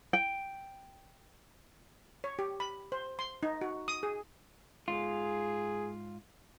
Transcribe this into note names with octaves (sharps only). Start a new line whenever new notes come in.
G5
C#5
G4
B5
C5
C6
D#4
F#4
D#6
G#4
G#2 F4 G#4